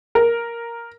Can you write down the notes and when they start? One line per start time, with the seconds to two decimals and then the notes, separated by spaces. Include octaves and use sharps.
0.15 A#4